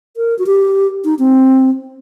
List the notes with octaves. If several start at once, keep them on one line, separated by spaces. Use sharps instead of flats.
A#4
F#4
G4
D#4
C4